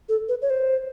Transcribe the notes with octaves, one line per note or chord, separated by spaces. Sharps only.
A4
B4
C#5
C5